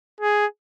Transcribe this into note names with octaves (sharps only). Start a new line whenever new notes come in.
G#4